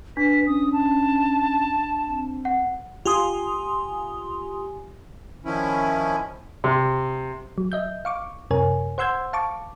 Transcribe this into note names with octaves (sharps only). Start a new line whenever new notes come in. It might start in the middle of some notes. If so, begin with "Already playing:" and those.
D4 B4 B6
C#4 D#6
A5
C4
F#5
F4 G4 G#5 C6 D#6
D#3 F3 C#4 E4
C3
F#3
D#5 E5 G6
F5 C#6 D6
F#2 C3 A#4 C#5 G#5
C5 F#5 C6 E6 G6 G#6
F5 A5 C#6 D6